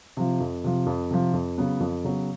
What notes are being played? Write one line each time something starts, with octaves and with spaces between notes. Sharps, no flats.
C3 F3
F2
C3 F3
F2
C3 F3
F2
C#3 F#3 B3
F2
C#3 F#3 B3